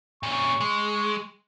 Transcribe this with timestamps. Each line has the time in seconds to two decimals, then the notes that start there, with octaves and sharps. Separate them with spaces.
0.23 A#2 C#4 C#6
0.61 G#3